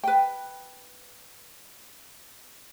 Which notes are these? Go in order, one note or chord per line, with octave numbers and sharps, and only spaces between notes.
B4 G5